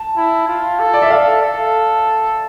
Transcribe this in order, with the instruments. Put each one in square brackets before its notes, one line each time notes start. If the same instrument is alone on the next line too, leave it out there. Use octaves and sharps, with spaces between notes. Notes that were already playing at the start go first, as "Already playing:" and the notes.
Already playing: [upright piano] A5
[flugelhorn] E4
F4
A4
[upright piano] D5
E5
[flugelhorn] A4 [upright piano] F5
[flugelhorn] A4